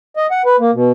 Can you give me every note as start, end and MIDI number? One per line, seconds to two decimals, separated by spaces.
0.17 0.26 75
0.31 0.42 78
0.45 0.56 71
0.60 0.71 58
0.73 0.92 47